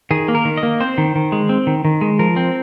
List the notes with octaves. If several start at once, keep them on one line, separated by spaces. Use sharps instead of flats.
D#3 G#4
A#3
A#4
D#3
D#5
A#3
C4 C5
D#3
D#3
G#3
C4
D#3
D#3
G#3
F3 A#4
C4